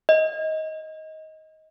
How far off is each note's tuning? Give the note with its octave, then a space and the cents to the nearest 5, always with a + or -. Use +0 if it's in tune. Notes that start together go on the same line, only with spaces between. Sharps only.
D#5 +15